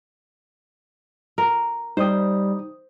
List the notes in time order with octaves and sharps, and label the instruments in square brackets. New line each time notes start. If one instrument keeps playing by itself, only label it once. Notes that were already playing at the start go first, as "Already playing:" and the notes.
[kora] A#4
[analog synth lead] G3 [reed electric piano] D#4 D#6 [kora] C5